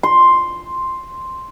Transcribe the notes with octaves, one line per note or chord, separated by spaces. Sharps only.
C6